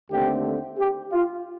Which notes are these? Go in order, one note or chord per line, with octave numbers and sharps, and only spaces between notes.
D#2 D3 A3 C4 G4
G4
F4